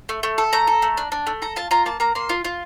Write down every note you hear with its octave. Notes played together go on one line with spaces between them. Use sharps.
A3
A3
A4
A3 A#5
A4
A3
D4
D4
A3
A4 A#5
F4 A5
F4 A#5
A#3 A5
A#3 A#5
A#3 C6
F4
F4